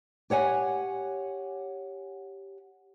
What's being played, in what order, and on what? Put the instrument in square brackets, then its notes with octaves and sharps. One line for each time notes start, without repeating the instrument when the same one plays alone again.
[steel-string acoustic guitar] G4 C#5 F#5 G#5